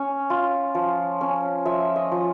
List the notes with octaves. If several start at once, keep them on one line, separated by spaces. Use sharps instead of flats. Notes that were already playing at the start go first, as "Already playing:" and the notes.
Already playing: C#4 C#5
F4
F3
C#4
F3 E5
D#5
F3